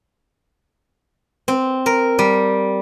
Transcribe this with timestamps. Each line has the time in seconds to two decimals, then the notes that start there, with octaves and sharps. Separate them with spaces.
1.48 C4
1.86 A#4
2.19 G3